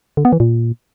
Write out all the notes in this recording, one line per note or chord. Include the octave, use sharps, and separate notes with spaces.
D3
B3
E3
A#2